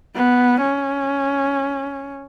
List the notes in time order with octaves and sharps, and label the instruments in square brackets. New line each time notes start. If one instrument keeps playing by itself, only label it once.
[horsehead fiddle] B3
C#4